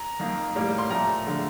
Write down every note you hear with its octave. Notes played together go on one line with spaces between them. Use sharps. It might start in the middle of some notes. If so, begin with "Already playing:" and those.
Already playing: A#5
F2 D#3 A#3
A2 G3 A#3
C6
A#2 F3 A3 A#5
D3 F3 A3